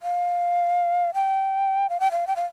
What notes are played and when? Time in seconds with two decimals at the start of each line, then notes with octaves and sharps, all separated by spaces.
0.02 F5
1.14 G5
1.90 F5
2.00 G5
2.11 F5
2.27 G5
2.36 F5